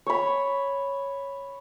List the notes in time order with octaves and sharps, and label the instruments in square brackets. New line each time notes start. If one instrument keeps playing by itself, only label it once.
[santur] C#5 B5